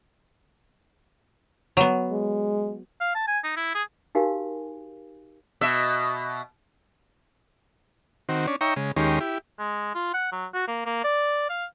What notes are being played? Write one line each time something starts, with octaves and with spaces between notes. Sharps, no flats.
F#3 B3
G#3
F5
A5
G#5
D#4
E4
G#4
D#4 F#4 G4 A#4 F5 G#5
B2 E5
D#3 C4 F#4
C#4 D4
D#4 C#5 E5 G5 A#5 C#6
C#3 G#3
D#2 D#3 G#3 C#4 G4 C6
E4 G4
G#3
F4
F#5
F#3
F#4
A#3
A#3
D5
F5